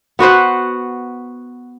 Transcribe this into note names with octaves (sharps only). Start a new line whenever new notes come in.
B3 F#4 B4 C5